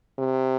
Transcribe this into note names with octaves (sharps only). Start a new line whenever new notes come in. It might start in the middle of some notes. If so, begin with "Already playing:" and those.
C3